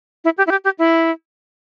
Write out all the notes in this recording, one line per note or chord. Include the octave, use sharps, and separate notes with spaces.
E4
G4
E4
G4
G4
E4